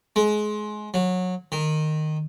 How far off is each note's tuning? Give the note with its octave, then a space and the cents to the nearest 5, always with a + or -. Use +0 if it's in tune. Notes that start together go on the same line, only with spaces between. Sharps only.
G#3 +25
F#3 -20
D#3 -15